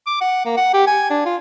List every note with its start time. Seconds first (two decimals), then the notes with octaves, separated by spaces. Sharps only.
0.07 D6
0.21 F#5
0.46 A#3
0.57 F#5
0.74 G4
0.87 G#5
1.10 D4
1.26 F4